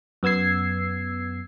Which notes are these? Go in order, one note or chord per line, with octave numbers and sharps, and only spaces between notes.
F#2 B3 E6 G#6 C7